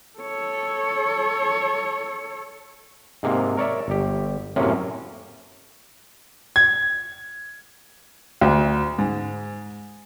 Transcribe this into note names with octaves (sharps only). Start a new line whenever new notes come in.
A4 C#5
G#2 C3 A#3
A#4 C#5 D5 E5
G1 G4
F#2 A2 C3 A#3 C#4
G#6
D2
G#2